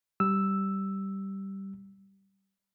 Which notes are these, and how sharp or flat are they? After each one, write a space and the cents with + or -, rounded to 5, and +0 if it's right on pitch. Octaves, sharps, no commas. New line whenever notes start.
G3 -10 E6 +0